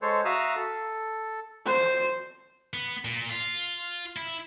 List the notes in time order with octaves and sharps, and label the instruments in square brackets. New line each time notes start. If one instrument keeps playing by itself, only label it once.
[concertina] G#3 A4 C5 C#5
F#4 E5 F5 A#5 D#6 E6
A4
[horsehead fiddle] C5
[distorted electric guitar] B3
A#2
F4
E4